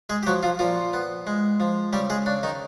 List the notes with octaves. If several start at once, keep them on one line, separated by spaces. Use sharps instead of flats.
G#3 G#4
G4
F3 F#3 F#4
F3 F4
A#2 F3 F4
B3
G#3
F3
C#3 G3 G4
G#3 G#4
C#3 D4
D#3 D#4